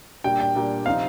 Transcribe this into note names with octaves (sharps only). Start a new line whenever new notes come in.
A#2 G3 D4 G5
G5
A#2 G3 D4
C3 F3 C4 D#4 F5